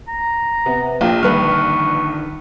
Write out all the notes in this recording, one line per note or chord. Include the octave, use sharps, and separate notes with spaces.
A#5
C3 B3
A#1 F4 G5
D3 D#3 G3 B4 C#6 F6